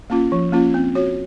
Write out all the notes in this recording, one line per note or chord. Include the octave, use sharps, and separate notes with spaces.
A#3 C#4 F4
F3
A#3 C#4 F4
C4
F#4 C#5